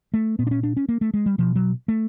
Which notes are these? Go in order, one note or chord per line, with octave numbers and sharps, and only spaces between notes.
A3
A#2 B3
D4
C#4
D4
C#4
A#3
A3
G#3
G3
B2 F3
F#3
A3